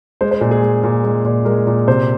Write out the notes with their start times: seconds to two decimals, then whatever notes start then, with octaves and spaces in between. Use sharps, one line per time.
0.21 G#3 C5
0.31 C5
0.41 A#2 G#4
0.51 G#4
0.62 G#3
0.84 A#2
1.04 G#3
1.25 A#2
1.45 G#3 A#4
1.67 A#2
1.88 C3 C5